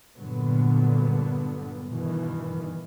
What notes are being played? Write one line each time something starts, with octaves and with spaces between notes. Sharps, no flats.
G2 A#2 D3 F#3 B3
G2 B2 D#3 E3